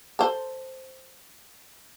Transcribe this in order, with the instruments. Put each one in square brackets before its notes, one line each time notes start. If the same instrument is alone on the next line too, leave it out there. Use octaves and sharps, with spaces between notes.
[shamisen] A4 C5